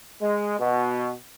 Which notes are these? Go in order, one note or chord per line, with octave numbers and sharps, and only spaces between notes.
G#3
B2